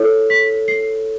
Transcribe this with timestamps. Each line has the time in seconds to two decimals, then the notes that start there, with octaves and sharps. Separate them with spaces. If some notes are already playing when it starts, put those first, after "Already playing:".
Already playing: E4 A4 C#5
0.30 B6
0.68 C7